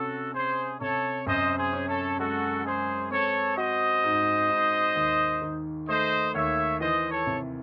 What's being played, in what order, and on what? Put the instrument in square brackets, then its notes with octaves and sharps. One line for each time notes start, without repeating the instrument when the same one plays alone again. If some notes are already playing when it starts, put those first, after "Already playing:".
Already playing: [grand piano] C3 C#4 [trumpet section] F#4 A4
[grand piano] C#4 [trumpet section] G#4 C5
[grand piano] C3 [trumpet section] A4 C#5
[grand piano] F#2 [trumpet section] C5 D#5
[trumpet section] G#4 C5
[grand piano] C#4
[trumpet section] A4 C#5
[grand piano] G#3 [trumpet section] F#4 A4
[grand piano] G#3 [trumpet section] G#4 C5
[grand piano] C4 [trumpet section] A4 C#5
[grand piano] F#4 [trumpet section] C5 D#5
[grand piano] G#2
G#2
D#2
D#3
[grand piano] A3 [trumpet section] C5 D#5
[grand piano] D#2 [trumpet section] C#5 E5
[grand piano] E3 [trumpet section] C5 D#5
[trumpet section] A4 C#5
[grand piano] C3